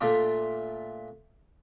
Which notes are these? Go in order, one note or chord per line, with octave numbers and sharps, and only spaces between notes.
A#2 A3 D4 F4 D6